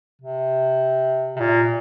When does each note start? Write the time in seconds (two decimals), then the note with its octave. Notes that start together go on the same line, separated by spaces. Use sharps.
0.22 C3
1.36 C3
1.40 A#2